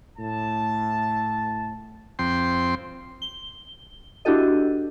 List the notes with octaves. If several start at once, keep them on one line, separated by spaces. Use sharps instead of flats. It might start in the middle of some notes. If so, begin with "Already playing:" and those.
A2 A5
F2 C4 G5 C6
G7
D4 E4 F#4 G4 A4 D#5